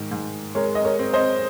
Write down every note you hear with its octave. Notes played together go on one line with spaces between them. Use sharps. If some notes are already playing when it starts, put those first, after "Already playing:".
Already playing: G#2 D#3
G#2
G#3 A#4 C#5
D#5
A#4 C#5
C4
C5 D#5